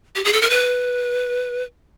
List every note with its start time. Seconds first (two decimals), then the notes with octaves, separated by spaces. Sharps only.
0.15 G4
0.25 G#4
0.33 A4
0.42 A#4
0.50 B4